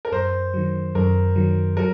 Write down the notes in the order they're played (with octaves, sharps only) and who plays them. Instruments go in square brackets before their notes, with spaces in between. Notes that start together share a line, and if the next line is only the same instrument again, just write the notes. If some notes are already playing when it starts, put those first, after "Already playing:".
[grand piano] A#4
[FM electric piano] F#2 [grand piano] C5
[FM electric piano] D#3 F#3
[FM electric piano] F#2 [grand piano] A#4
[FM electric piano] D#3 F#3
[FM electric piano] F#3 [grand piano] A#4